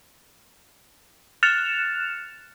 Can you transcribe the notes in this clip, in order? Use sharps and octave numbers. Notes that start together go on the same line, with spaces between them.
F6 F#6 A6 C#7 E7 F7